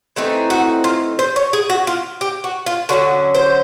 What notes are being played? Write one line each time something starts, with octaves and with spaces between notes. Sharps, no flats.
E3 A3 C4 D#4
F#4
F4
C5
C#5
G#4
F#4
F4
G4
F#4
F4
D3 F#3 A3 C#4 F#4
C5